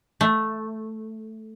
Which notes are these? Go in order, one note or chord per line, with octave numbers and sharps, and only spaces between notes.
A3